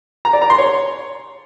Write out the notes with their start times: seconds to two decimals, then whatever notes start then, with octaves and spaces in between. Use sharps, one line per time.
0.25 A#5
0.33 D5
0.42 A#5
0.50 C6
0.58 C#5